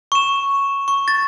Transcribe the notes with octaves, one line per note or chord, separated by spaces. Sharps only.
C#6 E7
C#6
A6